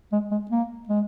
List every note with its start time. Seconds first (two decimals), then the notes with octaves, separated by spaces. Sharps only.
0.12 G#3
0.31 G#3
0.51 A#3
0.89 G#3